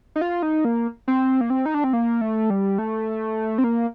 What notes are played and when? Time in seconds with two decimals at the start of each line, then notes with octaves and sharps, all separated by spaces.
0.16 D#4
0.21 F4
0.42 D#4
0.65 A#3
1.08 C4
1.41 A#3
1.50 C4
1.66 D#4
1.74 D4
1.84 C4
1.93 A#3
2.21 A3
2.50 G3
2.78 A3
3.58 C4
3.64 A#3